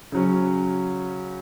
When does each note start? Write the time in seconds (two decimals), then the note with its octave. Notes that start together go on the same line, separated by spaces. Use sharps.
0.12 C#3 F#3 C#4